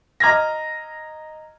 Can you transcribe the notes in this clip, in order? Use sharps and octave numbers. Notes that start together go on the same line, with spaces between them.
D#5 A#5 F6 G#6 A#6